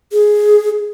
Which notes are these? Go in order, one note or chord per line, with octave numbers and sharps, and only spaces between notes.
G#4